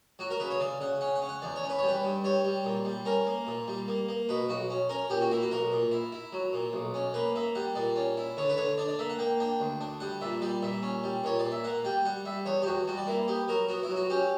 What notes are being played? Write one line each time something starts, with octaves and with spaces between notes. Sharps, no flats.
F#3 F#4
A#4
C#3 B4
C#5
C#3 D5
C#3 F#5
C#4 F#5
F#5
C#4
F#5
E2 D5
C#5
C#4
B4
G3 C#5
B4
G2
G3 C#5
G3
A#2
G3
C#4 A#4
A#3
A#2
G3
A#3
A#3
B2 B4
B1 F#4
C#4
C#4 A#4
A#2 G4
F#4
A#3 E4
F#4
B1 A#4
A#2
E4
E4
F#3
A#2
B1
C#4
A#3 B4
A#3 E5
G3 F#5
A#2 D5
C#4
E4
D3 C#5
B4
D3 C#5
D4 D5
D5
A#3 E5
F#5
A#3 G5
D4 G5
D2
D4
G3 F#5
A#2 E5
G3 D5
A#2 E5
C#4
G3
A#2 C#5
A#2 D5
E5
A#3 F#5
G3 G5
G3 F#5
G3 E5
E2 C#5
G4
E2 F#4
G3 F#4
D5
A#3 E4
B3 G4
F#3 A#4
B3 F#4
E4
F#3
F#4
C#4 G4